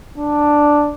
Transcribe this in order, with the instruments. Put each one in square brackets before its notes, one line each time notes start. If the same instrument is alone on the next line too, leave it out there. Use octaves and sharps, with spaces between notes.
[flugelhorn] D4